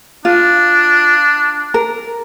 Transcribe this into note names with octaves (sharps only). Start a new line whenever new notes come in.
D4 F4
A#4